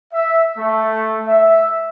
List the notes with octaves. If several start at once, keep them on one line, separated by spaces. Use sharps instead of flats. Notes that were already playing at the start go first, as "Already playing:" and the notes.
E5
A3
E5